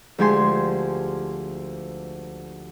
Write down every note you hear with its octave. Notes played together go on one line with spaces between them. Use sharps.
D2 F3 G#3 G4 G#5 C6